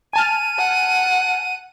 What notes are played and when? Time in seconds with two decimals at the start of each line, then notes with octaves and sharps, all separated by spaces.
0.13 G#5 A5 F6 D#7
0.59 F#5